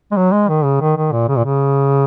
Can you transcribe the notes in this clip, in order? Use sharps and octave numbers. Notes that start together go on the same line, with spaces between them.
G#3
F#3
G#3
D#3
C#3
D#3
D#3
A#2
C#3
A#2
C#3